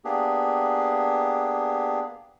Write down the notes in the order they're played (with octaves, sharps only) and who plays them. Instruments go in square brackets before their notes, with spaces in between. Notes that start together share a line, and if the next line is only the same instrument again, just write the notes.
[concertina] A#3 B3 D4 G4 G#4